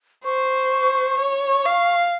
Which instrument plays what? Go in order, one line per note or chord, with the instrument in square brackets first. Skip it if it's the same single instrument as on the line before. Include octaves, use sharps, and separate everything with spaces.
[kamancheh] C5 [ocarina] C#6
[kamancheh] C#5
F5